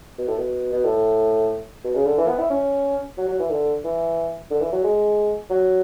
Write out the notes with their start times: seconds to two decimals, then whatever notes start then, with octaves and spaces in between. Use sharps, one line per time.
0.18 B2
0.28 A2
0.38 B2
0.73 B2
0.84 A2
1.84 B2
1.95 C#3
2.06 D3
2.18 E3
2.28 B3
2.39 E4
2.50 C#4
3.18 F#3
3.28 F#3
3.40 E3
3.50 D3
3.84 E3
4.51 D3
4.61 E3
4.72 F#3
4.84 G#3
5.50 F#3